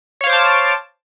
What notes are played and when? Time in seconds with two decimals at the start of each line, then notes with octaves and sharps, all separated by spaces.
0.21 C#5
0.24 F5
0.27 C5
0.30 D6
0.33 A5